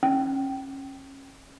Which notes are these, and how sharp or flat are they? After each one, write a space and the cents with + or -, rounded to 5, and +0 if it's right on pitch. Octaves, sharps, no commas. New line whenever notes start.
C#4 -30